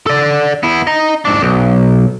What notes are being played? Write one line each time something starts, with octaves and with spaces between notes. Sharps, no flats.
A4 D5
B3 E4
D#5 A#5
G#2 D4
B1